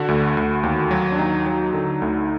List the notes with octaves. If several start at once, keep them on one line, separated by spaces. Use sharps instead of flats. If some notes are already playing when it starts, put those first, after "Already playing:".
Already playing: D3 F#4
D2
D2
D#2
F#3
D4
D#2 D#4
F#3
D3
D2